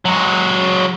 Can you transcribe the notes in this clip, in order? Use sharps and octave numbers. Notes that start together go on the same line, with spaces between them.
F#3 G#3